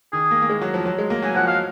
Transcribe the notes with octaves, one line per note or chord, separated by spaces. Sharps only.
D#3 G#4
A#3
A#3
G#3
F#3
F3
F#3
G#3
A#3
F#3 G#5
F3 F#5
F#3 F5